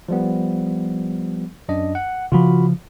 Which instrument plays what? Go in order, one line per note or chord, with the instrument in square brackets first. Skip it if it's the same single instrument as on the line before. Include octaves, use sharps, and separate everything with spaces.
[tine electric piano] F3 G3 B3
F#2 D4 D#5
F#5
[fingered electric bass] C#3 F3 [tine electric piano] F4 F#4 B5